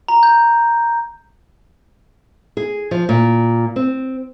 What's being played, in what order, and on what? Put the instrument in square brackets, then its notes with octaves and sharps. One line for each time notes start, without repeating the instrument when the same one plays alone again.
[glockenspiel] A#5
G6
[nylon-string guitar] G#4
F3
A#2
C4